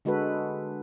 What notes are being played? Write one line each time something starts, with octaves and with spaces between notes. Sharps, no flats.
D3 G#3 F#4 A4 B4